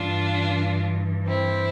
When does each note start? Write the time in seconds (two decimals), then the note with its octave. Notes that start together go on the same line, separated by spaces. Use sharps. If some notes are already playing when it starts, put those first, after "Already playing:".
Already playing: G2 E3 D4 F4
1.28 C4 E4